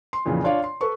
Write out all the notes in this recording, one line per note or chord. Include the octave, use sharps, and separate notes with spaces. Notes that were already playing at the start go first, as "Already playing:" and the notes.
C6
F2 A#2 C#3 E3
D4 F4 C#5 D5 F5
C6
A4 B4 C#6